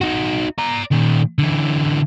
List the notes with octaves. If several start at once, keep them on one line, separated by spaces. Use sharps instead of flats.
D#4 F#4
D5 A#5
A#2 D#3
D3 E3